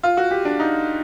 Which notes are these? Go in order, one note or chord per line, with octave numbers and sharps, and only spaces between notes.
F4
F#4
G4
D4
D#4